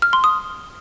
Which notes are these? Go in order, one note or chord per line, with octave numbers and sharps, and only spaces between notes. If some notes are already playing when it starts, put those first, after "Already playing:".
F6
C6
D#6